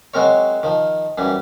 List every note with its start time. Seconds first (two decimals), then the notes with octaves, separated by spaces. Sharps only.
0.14 F#3 G#3 C4 A#4 C#5
0.63 D#3 F3
1.18 F#2 E3 G3